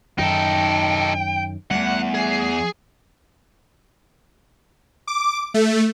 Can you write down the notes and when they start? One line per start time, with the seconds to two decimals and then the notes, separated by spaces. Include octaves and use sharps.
0.19 F#2 D#3 D#4 A4 G5
1.71 E2 G3 A3 F#5
2.14 G#4
5.07 D6
5.54 A3